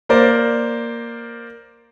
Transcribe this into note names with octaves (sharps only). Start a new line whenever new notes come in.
A#3 A#4 C5 D5